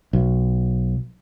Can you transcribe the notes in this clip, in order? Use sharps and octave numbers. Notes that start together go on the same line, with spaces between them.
B1